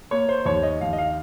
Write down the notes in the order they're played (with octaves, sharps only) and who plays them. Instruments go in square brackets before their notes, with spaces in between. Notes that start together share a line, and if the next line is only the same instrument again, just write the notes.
[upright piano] A#3 C#5
C5
D#2 C#5
D#5
D#2 F5
D#5
F5